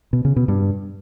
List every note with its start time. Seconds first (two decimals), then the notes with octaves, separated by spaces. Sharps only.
0.13 B2
0.25 C#3
0.36 B2
0.48 G2